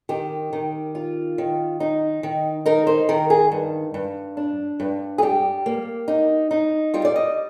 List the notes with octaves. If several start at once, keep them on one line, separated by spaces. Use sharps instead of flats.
D#3 G4
D#3
F4
D#3
D#4
D#3
D#4 A#4
C5
D#3 A#4
G#4
G2
G2
D4
G2
G#4
G3 G4
A#3
D#4
D#4
G3 F4
D5
D#5